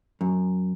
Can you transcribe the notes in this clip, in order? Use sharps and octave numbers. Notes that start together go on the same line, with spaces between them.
F#2